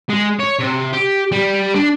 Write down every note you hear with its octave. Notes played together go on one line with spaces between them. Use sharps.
G#3
C#5
C3
G4
G3
D4